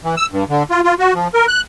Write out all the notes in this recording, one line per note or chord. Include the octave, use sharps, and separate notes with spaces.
E3
E6
G2
D3
F4
F4
F#4
F3
A#4
F#6